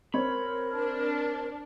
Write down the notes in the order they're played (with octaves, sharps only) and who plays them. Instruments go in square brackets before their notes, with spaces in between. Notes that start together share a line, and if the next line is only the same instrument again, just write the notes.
[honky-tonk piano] C4 C#5 [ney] A#4 [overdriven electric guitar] B5
[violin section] D4